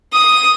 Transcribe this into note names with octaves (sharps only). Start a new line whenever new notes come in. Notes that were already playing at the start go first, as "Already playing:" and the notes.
D#6